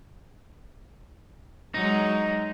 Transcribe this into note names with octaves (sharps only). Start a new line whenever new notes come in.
F#3 G#3 D#4